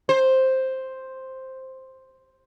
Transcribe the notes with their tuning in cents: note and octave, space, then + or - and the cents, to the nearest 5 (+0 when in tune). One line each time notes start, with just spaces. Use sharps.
C5 +5